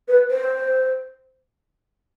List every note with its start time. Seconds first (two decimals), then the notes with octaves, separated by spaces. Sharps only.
0.08 B4
0.31 C5